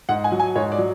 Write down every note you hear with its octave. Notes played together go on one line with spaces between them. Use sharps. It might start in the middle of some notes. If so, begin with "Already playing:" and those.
G#2 F#5
G#5
F#3
G#5
G#2 C#5
D5
F#3